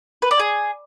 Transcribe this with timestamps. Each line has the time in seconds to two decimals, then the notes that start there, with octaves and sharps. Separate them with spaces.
0.22 B4
0.31 D5
0.39 G#4